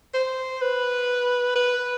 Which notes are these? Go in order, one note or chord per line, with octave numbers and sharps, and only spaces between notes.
C5
B4
B4